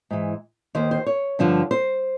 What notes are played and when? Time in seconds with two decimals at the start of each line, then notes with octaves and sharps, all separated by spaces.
0.11 G#2 E3
0.75 D#2 D#3 C5
0.91 C5
1.06 C#5
1.39 G2 D3 F3
1.71 C5